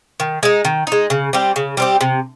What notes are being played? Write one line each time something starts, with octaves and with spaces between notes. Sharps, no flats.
D#3
G#3 D#4
D#3
G#3 D#4
C#3
G3 C4 G4
C#3
G3 C4 G4
C3